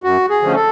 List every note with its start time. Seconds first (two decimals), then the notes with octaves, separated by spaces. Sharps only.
0.03 F#2 F#4
0.29 G#4
0.42 D3 F3 A3 C#4
0.55 A4